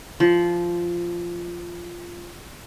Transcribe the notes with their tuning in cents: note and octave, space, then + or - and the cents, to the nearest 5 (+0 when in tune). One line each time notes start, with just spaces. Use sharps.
F3 -10